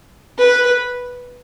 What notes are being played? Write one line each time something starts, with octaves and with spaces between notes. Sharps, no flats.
B4